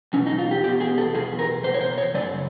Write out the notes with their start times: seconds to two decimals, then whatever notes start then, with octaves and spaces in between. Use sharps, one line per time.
0.13 E2 B2 C#4
0.26 D#4
0.38 F4
0.51 G4
0.64 E2 G4
0.67 B2
0.80 G#4
0.98 A4
1.14 E2 B2 G#4
1.39 A#4
1.64 E2 B2 C5
1.74 C#5
1.81 C5
1.98 C#5
2.14 F#2 C#3 D5